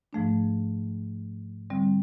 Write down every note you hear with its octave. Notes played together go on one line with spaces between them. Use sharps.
G#2 F3 A3 D4
D3 G3 C4